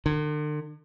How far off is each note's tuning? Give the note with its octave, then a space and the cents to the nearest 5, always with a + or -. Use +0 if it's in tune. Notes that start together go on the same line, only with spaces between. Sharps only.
D3 +45